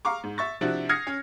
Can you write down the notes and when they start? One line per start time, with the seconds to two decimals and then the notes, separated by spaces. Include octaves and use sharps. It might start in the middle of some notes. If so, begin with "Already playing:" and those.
0.05 F5 A#5 C#6 D6
0.23 G#2
0.38 E5 C#6 A6
0.61 C3 F3 D4 E4 F#4
0.89 D#6 F6 G#6 A#6 C7 C#7
1.07 C#4